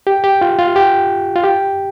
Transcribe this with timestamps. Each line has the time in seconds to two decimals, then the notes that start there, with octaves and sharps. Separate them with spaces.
0.07 G4
0.24 G4
0.41 F4
0.59 F4
0.76 G4
1.36 F4
1.43 G4